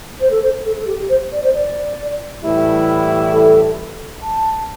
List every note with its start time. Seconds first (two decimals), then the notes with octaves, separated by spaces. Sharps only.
0.21 C5
0.31 A4
0.42 C5
0.66 A4
0.78 A4
0.87 G4
1.09 C5
1.32 D5
1.43 C5
1.54 D5
2.44 A2 E3 G3 E4
3.33 A4
4.23 A5